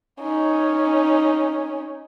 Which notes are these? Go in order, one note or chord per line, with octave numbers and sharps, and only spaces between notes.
C#4 D#4